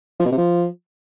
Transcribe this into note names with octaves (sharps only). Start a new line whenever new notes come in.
F3
B2
C3
F3